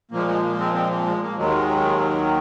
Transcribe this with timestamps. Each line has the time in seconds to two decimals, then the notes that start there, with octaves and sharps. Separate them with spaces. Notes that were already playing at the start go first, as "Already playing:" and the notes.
0.11 A#2 F3 G#3 A#3
0.27 G#3
0.43 A#3
0.58 G#3 C4
0.74 G#3 C4
0.90 A#3
1.06 G#3
1.22 A#3
1.38 D#2 D#3 F#3 G#3